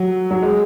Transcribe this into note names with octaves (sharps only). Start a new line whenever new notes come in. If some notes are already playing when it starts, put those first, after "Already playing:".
Already playing: F#3
F#3
G#3